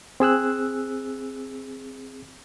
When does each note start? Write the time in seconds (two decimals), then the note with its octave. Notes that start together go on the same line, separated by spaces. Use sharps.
0.20 C4 G#4 E6 F#6